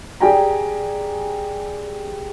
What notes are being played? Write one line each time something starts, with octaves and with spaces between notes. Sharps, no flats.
G4 G#4 D5 G5 G#5 A#5